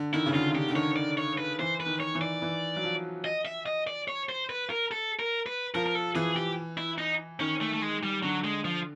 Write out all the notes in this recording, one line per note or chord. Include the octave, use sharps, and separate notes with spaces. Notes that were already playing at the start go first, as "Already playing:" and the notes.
Already playing: D3
D#3 E4
C#3
D3 F4
D#3
D3 G4
D3
D#3 C#5
D5
C#5
B4
E3 C5
B4
D#3
C#5
E3
D5
E3
F#3
F3
D#5
E5
D#5
D5
C#5
C5
B4
A#4
A4
A#4
B4
F3 A#4
A#4
A4
E3 G#4
G4
E4
D#4
D#3 C#4
A3
A3
G#3
G3
D3 F#3
G#3
F3